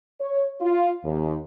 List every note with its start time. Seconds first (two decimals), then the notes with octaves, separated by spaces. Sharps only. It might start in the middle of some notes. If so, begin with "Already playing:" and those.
0.20 C#5
0.61 F4
1.05 D#2